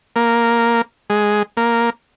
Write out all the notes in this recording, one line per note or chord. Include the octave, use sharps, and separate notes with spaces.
A#3
G#3
A#3